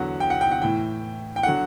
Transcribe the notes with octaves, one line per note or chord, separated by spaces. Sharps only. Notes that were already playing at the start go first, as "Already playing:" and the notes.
Already playing: E2 D3 F#3 F#5
G5
F#5
G5
F#5
A2 E3 G5
G5
D3 F#3 F#5